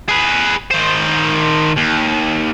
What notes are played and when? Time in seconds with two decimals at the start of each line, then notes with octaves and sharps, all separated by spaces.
0.09 G#4 B4
0.71 D#3 C5
1.77 D#2